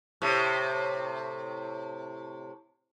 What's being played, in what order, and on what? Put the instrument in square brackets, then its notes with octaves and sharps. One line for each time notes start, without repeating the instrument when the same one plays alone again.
[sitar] A2 C3